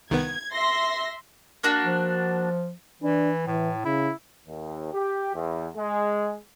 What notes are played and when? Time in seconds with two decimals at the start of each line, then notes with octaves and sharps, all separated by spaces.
0.10 C2 D#3 B3 G#6
0.53 E5 C6 A#6
1.63 A#3 D4 F#4
1.85 F3
3.02 E3 D4
3.47 A2 E3
3.85 C#3 E4
4.46 D#2
4.93 G4
5.34 E2
5.76 G#3